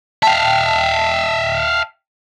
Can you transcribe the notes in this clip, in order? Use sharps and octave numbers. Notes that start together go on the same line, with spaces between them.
E5 F5 G5 A5